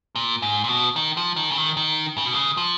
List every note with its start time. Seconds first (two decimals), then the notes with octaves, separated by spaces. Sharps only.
0.16 A#2
0.42 G#2
0.64 A#2
0.69 B2
0.96 D#3
1.17 F3
1.36 D#3
1.51 C#3
1.57 D#3
1.77 D#3
2.18 C#3
2.25 B2
2.34 C#3
2.57 F3